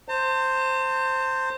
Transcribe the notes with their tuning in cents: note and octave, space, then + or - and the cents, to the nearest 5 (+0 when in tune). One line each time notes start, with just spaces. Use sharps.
C5 +0 A5 +45